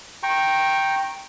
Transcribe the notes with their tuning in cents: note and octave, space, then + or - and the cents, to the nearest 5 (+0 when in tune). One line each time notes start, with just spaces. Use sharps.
G5 +0 A#5 +0 C#6 -25